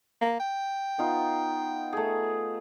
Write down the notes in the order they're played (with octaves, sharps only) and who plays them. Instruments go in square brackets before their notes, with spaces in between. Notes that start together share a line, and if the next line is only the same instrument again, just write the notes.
[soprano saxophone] A#3
G5
[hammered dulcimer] B3 D#4 F4
A3 G#4